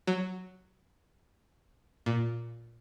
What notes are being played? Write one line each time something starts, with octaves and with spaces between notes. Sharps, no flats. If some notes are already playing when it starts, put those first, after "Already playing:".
F#3
A#2